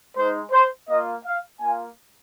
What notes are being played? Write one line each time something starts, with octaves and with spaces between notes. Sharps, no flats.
G#3 D#4 C5
C5
A#3 F4 D#5
F5
A#3 F4 G#5